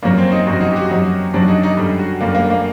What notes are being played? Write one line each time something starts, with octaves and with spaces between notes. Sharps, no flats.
F#2 F#3 A#3
C4
D#4
F#2 F#3 F#4
D#4
G4
F#4
F#2 F#3 D#4
F#2 F#3 D4
D#4
D#4
F#2 D3 G3
F#4
F#2 D3 G3 A#3
A#3
A#3